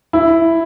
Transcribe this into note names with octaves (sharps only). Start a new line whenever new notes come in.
E4